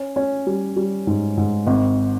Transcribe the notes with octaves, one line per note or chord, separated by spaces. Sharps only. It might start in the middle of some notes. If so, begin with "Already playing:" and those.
Already playing: C#4
C#4
G3
G3
G#2
G#2
G#1